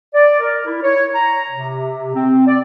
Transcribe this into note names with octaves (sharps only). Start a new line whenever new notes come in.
D5
A#4
E4
C#5
A#5
C3
C4
D5